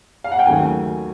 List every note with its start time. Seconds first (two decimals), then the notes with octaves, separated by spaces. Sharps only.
0.24 F5
0.32 F#5
0.39 G5
0.46 D#2 C#3 F#3 A3 G#5